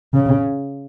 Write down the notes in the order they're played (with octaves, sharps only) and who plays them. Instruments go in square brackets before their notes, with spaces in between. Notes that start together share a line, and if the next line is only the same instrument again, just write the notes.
[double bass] C#3